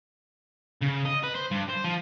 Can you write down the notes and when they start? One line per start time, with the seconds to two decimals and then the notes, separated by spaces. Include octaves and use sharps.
0.82 C#3
1.06 D#5
1.24 B4
1.35 C5
1.51 G2
1.69 C5
1.84 F3